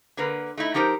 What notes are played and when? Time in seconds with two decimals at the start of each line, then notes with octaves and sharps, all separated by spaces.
0.17 D3 A#3 A#4 B4
0.57 A3 D#4 E4
0.74 F3 D#4 G4 A#4 C5